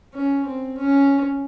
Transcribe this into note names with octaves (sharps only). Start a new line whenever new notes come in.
C#4
C4
C#4